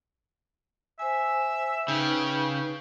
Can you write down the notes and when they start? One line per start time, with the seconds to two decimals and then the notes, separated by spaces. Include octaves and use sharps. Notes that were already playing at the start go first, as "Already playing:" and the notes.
0.99 C5 E5 G#5
1.88 C#3 D#4 B4 G5